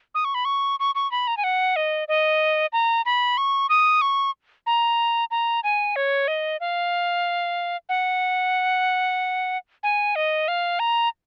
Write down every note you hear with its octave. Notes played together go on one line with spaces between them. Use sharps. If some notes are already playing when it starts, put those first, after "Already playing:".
D#6
C#6
B5
C#6
C#6
C#6
B5
A#5
G#5
F#5
D#5
D#5
A#5
B5
C#6
D#6
C#6
A#5
A#5
G#5
C#5
D#5
F5
F#5
G#5
D#5
F5
A#5